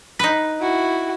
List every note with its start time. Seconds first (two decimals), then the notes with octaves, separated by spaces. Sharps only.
0.19 D#4 B4
0.60 E4 F#4